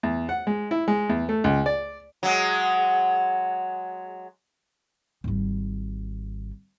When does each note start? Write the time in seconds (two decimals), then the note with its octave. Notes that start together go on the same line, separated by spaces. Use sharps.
0.03 E2
0.29 F#5
0.47 G#3
0.71 E4
0.88 G#3
1.09 E2
1.29 A3
1.44 C#2
1.66 D5
2.23 F#3 G#3
5.24 G#1 G3